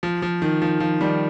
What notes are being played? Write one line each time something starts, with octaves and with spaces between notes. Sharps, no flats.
F3
F3
D#3
F3
F3
D#3 G3